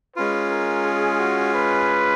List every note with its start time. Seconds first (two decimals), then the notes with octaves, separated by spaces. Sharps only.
0.16 G#3 C#4 F4 B4
0.51 A#4
0.85 G#4
1.19 F#4
1.54 B4